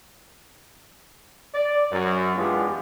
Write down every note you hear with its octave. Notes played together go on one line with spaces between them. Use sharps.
D5
F#2
E3 G#3 B3 D4 F4 G4